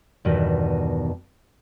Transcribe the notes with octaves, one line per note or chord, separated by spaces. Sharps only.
E2 G2 B2 D#3